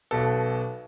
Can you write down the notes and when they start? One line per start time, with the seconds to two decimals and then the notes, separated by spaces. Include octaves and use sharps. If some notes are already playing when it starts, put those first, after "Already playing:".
0.11 B1 B2 A4